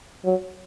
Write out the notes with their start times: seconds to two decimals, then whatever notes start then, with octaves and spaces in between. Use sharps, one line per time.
0.25 F#3